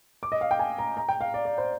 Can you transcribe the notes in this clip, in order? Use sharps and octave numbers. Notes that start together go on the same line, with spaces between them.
D6
D#5
F5
G5
G#5
A#5
A#5
G5
F5
D5
D5
C5